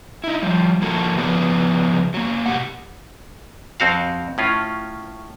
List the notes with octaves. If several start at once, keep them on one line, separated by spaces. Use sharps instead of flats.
D#4 E4
F3 G3
F3 A#3 F#4 A4
C#3 F3 B3 G#4 B4
F#3 A#3
B2 G4 F#5
F2 C4 F#4 F5
A2 C#4 F4